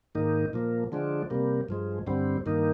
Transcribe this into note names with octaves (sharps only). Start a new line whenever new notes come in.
G#2 D#3 A#3 D#4
A#2 F3 A#3
D3 F3 G#3 D4
C3 G3 A#3
G2 F3 G#3
G2 D3 G3 C4
G2 D#3 A#3 D#4